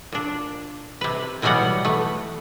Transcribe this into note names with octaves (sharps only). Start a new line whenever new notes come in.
A#2 D4
C3 B4
B2 E3 F#3 G3 B3 F#5
A3 B4